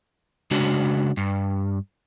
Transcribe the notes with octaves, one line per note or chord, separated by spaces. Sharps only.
C#3 G#3 D4 F#4
G2